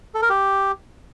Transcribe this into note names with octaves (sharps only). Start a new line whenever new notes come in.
A4
A#4
G4